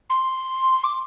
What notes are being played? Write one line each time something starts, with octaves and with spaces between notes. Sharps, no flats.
C6
D6